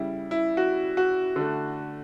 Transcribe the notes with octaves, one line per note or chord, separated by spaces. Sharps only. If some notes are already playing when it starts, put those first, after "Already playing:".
Already playing: C#3 G3 E4
E4
F#4
F#4
D3 A3